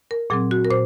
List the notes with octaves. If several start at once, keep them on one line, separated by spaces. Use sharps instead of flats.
A#4
A#2 F#3 C4 G#4
F#4
A#4
A#2 C5